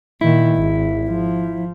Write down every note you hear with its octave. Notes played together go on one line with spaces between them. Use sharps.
A#2 D#3 E4
G#1
F3